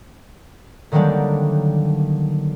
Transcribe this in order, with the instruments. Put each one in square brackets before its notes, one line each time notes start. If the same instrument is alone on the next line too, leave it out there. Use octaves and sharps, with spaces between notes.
[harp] D3 D#3 F#3 G3 A#3 D4